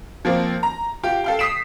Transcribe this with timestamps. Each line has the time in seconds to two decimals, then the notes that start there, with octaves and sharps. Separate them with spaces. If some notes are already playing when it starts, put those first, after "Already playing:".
0.25 F3 A#3 C4
0.63 A#5
1.03 F4 G4
1.24 A4 F5 G5
1.39 D#6 B6 C7 D7 E7